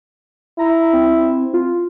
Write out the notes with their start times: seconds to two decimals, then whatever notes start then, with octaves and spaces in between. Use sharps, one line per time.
0.59 E4 A#5
0.93 C4
1.54 F4